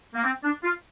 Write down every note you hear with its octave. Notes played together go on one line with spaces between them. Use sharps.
A#3
C4
D4
F4